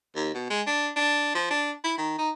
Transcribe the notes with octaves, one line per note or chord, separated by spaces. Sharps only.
D#2
B2
G#3
D4
D4
F3
D4
E4
D#3
D#4